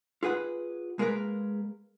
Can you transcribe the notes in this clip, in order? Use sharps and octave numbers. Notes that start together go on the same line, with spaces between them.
F4 G#4 B4 F#5
G#3 A#3 G#4 A#4 B4